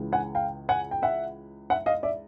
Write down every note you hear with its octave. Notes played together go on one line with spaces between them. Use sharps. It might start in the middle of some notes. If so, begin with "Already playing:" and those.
Already playing: C#2 C#3 E3
F#5 G#5
F5 G5
F#5 G#5
G5
E5 F#5
E5 F#5
D#5 F5
D5 E5